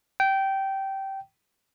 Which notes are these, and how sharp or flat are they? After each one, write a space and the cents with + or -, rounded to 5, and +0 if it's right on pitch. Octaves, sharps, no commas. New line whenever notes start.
G5 -15